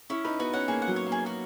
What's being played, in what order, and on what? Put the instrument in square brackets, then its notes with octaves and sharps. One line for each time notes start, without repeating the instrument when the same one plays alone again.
[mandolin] C#4 [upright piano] E4
[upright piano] D#4 [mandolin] B4
[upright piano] B3 [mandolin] F#4
[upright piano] C#4 [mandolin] F#5
[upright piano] A#3 [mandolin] G#4
[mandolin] F#5
[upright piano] F#3
[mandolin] C#5
[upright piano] A#3
[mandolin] G#4
F#4